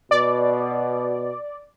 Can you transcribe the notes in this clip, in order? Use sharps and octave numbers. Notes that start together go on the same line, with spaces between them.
B2 D5